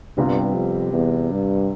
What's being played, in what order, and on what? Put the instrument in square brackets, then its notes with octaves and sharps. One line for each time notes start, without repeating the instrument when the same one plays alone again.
[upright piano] C2 C3 G3 B3 F4 [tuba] G2
[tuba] F2
E2
G2